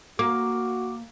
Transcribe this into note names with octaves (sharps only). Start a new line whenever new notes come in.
A#3 F#4 D6